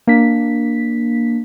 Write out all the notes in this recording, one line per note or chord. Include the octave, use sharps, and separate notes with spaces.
A#3 D4 B6